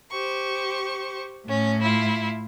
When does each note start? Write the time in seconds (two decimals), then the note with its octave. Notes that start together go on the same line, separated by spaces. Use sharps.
0.11 G4 C5 C#6
1.47 A2 C#4
1.80 E4 F4